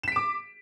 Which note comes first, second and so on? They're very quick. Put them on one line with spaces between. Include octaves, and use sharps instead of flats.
E7 B6 D7 D6